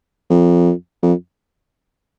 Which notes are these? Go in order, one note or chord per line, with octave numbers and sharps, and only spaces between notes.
F2
F2